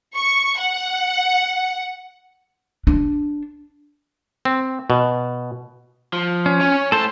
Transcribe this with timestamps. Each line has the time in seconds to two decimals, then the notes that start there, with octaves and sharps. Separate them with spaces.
0.16 C#6
0.60 F#5
2.87 D4
4.45 C4
4.90 B2
6.13 F3
6.46 C#4
6.61 C#5 G#5
6.92 A2 A4 C5 A5